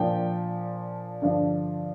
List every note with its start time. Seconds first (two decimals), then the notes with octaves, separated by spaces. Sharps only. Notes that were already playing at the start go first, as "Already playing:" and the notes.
Already playing: A#2 F3 D4 G5
1.22 G2 D3 F3 D4